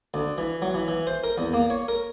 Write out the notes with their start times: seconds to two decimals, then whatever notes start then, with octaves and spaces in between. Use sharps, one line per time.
0.14 D2
0.38 E3
0.62 F#3
0.74 E3
0.88 E3
1.07 C5
1.24 A#4
1.38 E2
1.54 A#3
1.70 C#5
1.88 A#4